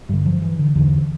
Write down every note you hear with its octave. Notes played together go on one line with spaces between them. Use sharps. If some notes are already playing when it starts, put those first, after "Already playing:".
G2 D3 G3
F3
E3
D3
E2 D3 E3